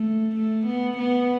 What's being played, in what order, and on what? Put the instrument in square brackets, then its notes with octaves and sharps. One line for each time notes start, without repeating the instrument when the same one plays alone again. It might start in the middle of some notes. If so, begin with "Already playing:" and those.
Already playing: [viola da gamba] A3
A3
B3
B3